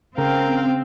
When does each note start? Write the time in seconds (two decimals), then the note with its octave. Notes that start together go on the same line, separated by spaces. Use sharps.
0.18 C#3 C4 A#4 F5 G5